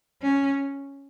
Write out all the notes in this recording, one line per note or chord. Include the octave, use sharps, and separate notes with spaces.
C#4